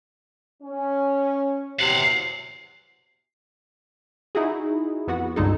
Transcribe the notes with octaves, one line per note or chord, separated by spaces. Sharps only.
C#4
E2 C3 F#3 F5 F#5
D#4 E4 F#4 G#4
F2 B3 F#4 F#5
C#2 G2 D3 G#3 D#4 A4